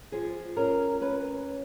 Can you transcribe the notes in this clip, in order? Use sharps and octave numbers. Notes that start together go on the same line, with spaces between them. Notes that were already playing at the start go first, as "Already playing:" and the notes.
F3 G#4
C#4 A#4
C#4 B4